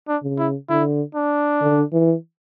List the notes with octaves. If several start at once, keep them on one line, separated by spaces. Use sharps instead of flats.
D4
C#3
E4
D3 E4
D4
D3
E3